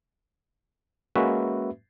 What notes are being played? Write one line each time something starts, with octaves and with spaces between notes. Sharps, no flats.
G#3 A#3 C#4 F#4 B4 E5